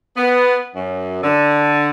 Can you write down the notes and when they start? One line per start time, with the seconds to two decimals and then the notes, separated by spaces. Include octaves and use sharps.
0.17 B3
0.76 F#2
1.23 D3